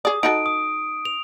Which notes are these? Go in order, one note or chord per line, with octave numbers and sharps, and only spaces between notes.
G#4 D5 D#6
D#4 F#4 A4 D7
D#6
F7